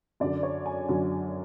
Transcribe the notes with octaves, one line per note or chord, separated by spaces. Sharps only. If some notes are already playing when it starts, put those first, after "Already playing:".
F#2 D3 F#3 D5
C#5
G#5
F#2 D3 F#3